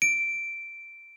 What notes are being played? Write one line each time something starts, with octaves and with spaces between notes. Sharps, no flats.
D7